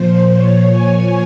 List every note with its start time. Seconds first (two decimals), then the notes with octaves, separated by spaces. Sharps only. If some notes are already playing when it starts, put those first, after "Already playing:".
Already playing: A#2 F3 C5
0.34 A#2 F3 C#5
0.70 G#5